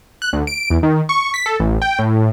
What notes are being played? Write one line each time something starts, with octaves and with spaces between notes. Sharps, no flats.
F#6
D2
D7
E2
D#3
C#6
B6
A4
A1
G5
A2